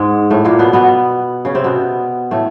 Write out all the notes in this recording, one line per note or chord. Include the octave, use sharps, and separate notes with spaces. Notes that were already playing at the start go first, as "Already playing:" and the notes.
Already playing: G#2 G#3
A2 A3
A#2 A#3
B2 B3
B2 B3
C#3 C#4
C3 C4
B2 B3
A2 A3